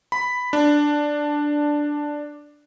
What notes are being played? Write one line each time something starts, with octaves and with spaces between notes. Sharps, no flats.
B5
D4